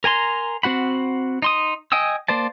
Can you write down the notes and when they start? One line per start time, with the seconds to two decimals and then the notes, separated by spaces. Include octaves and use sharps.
0.04 A#4 G#5 A#5 C6
0.63 C4 F#4 F#5 B5
1.42 D#4 C6 D#6
1.92 D#5 G5 G#5 D#6 E6
2.28 A#3 C5 D5 A5